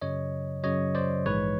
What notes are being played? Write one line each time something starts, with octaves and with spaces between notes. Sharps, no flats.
F#2 C#3 F#3 C#5 D#5
F#2 C#3 F#3 C#5 D#5
C5 D5
A#1 G#2 E3 G#3 B4 C#5